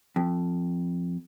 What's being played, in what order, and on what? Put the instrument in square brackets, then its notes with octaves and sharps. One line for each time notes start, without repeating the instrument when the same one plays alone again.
[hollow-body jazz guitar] F2